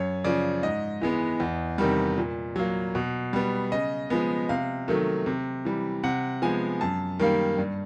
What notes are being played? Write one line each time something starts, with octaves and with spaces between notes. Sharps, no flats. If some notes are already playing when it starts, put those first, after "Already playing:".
Already playing: F#2 C#5
C#3 F3 D5
G#2 D#5
E3 G#3 B3
E2
C3 D#3 G3
A#2
F#3 A#3
B2
G3 B3
C#3 D#5
F3 G#3 B3
C3 F5
D#3 F#3 A3
C3
E3 G3
C3 F#5
F3 G#3 B3 G#5
F#2 A5
D#3 G3 A#3
G2